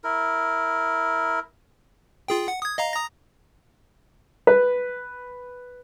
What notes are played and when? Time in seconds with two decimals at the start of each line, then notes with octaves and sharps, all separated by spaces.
0.04 E4 A#4
2.28 F4 G#4 G5
2.48 F#5
2.62 D#6 G#6
2.78 D#5 F5 A#5
2.93 A#5 D#6 A#6
4.47 B4